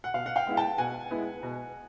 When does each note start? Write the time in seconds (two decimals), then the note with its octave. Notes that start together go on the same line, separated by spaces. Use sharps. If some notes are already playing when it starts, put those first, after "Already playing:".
0.04 F#5
0.14 B2 F5
0.26 F#5
0.36 F5 G5
0.47 G#3 B3 E4
0.57 G5 A5
0.78 B2 F#5 G#5
1.11 G#3 B3 E4
1.43 B2